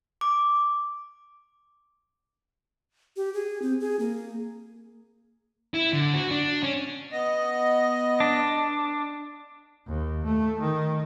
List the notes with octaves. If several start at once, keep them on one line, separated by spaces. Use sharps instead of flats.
D6
G4
G#4
C4
G#4
A#3
E4
D3
F#4
D4
C#4
B3 D#5
D4
D#2
A3
D#3